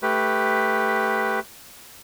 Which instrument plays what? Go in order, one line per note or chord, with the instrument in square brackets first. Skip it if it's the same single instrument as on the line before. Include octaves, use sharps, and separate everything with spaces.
[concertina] A3 G4 B4